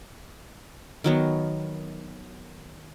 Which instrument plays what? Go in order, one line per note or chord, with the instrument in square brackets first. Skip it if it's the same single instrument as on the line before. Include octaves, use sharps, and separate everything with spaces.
[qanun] D#3 F#3 B3